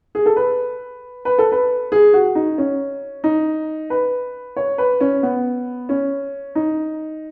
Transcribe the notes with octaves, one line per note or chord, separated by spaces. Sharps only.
G#4
A4
B4
B4
A4
B4
G#4
F#4
D#4
C#4
D#4
B4
C#5
B4
C#4
B3
C#4
D#4